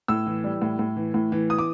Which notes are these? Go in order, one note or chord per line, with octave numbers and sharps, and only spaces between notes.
A2 E6
E3
G3
A2
A2
E3
A2
E3
D#6
D6